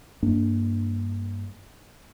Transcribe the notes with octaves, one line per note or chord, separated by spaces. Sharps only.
G2 A#3 D4